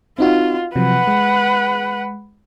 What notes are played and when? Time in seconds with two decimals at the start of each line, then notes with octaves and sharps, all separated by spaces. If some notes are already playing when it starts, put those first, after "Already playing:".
0.18 C4 D#4 F4 F#4
0.76 C3 F3 F#3 B4 F#5
1.07 G#3